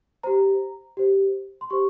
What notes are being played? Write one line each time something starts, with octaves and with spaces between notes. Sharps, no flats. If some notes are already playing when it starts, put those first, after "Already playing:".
G4 C5 A#5
G4 C5
C6
G4 C5 C#6